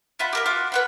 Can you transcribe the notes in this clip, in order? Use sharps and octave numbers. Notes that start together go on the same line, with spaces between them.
F4 E5 F#5 B5
G4 A#4 E5
F4 F#4 D6
B4 F#5 B5